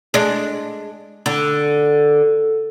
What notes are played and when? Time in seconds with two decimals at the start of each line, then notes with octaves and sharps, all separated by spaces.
0.14 G#3 D4
1.26 D3